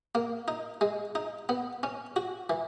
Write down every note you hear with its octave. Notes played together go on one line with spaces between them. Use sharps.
A#3
D#4
G#3
D#4
B3
C#4
F#4
E3